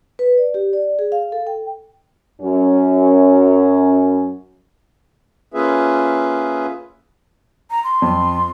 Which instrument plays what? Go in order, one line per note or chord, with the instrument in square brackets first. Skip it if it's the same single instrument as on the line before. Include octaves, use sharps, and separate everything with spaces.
[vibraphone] B4
D5
G4
D5
G#4
F5
A4
G5
[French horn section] F#2 C#4
[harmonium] A#3 C#4 F4 G#4 B4 E5
[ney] A#5
C6
[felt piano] F2